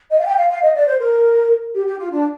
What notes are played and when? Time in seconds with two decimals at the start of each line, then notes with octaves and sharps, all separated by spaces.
0.11 D#5
0.18 F5
0.26 G5
0.38 F5
0.50 F5
0.63 D#5
0.75 D5
0.87 C5
1.00 A#4
1.74 G4
1.87 G4
1.99 F4
2.11 D4